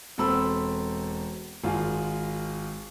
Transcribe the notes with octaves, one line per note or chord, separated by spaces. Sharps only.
E1 C4 A4 B5 E6
G#1 F4 G#4